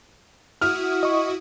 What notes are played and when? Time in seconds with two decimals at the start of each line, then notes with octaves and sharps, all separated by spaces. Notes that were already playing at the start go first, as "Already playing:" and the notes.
0.61 E4 F#4 D#6 F6
1.03 D#5 C#6